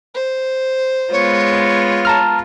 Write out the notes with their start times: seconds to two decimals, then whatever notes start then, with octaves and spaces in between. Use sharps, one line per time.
0.14 C5
1.11 G#3 B3 F4 C#5
2.05 A5 A#5 F6